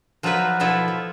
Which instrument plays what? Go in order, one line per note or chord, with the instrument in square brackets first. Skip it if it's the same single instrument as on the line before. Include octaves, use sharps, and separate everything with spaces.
[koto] F3 F#3 D#4 F4 F#4 B4
B2 F3 B3 E4 A4
F3